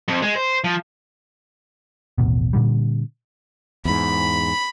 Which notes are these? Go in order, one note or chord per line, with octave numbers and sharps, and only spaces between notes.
F2
G#3
C5
F3
D#1 A1 B2
A#2 D3 G3
E2 G#2 B5